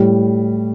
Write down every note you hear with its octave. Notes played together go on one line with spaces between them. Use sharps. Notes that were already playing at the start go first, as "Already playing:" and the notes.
Already playing: A2 G3